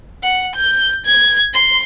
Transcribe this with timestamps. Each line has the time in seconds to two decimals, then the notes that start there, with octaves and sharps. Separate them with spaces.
0.23 F#5
0.56 G6
1.06 G#6
1.54 C6